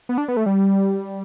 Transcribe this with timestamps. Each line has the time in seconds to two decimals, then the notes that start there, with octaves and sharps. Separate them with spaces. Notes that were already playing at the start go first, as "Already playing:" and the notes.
0.09 B3
0.18 D4
0.28 B3
0.37 A3
0.46 G3